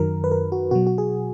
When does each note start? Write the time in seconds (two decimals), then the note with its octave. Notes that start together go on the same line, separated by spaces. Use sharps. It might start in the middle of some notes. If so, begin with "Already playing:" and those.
Already playing: F#2 D#3 F#3 A#4
0.24 B4
0.32 A#4
0.52 F#4
0.71 B2 F#3 F#4
0.87 F#4
0.98 G#4